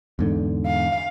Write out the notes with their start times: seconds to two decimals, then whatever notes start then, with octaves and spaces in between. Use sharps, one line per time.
0.19 E2 G#2 D3
0.66 F5